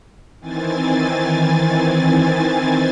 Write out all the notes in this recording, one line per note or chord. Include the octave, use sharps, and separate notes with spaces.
D#3 E3 C4 G#5 A6